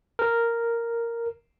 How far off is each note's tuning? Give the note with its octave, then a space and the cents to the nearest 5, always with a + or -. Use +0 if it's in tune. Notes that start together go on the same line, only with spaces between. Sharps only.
A#4 -5